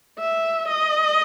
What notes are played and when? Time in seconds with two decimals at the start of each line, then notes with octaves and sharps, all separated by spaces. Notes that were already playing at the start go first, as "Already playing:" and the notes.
0.19 E5
0.68 D#5